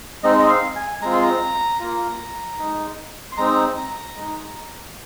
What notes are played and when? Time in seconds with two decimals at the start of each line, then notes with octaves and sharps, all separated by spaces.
0.24 G#3 C4 D#4 D#5
0.39 D#5
0.49 F5
0.76 G#5
1.01 G#3 C4 F4 A#5
1.13 C6
1.23 A#5
1.80 A#3 F4
2.59 G#3 D#4
3.32 C6
3.37 G#3 C4 D#4 A#5
3.77 A#5
4.16 G#3 D#4